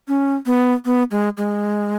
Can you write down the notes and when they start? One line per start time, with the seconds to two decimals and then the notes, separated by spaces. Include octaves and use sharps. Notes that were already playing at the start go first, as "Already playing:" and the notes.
0.08 C#4
0.46 B3
0.85 B3
1.11 G#3
1.37 G#3